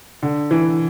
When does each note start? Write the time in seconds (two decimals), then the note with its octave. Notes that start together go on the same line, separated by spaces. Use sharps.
0.23 D3
0.51 E3